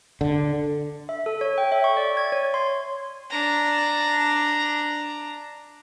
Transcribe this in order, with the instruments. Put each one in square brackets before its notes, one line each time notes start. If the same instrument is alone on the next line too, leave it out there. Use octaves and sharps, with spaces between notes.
[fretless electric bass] D3
[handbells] E5
A4
C#5
G5
E5
C#6
D5
G#6
C#5
C6
[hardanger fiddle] D4 A#5